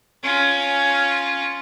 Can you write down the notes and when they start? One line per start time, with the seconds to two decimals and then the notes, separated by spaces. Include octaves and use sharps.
0.23 C#4 F4